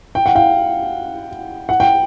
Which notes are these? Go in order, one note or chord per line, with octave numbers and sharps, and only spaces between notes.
G5
F#5
F5 G5
F#5
G5